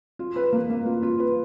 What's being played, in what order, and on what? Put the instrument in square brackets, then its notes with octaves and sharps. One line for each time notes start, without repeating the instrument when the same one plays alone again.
[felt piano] F4
B4
A#3
A#3
F4
F4
B4